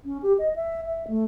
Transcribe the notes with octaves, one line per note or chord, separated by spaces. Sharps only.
C#4
G4
D#5
E5
E5
A3